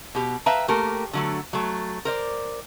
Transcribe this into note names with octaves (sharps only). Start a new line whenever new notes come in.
B2 G4
B4 E5 F5 G5 A5 A#5
A3 A#3 G4 A#4
D3 F#3 A3
F#3 A3
A#4 C5 D5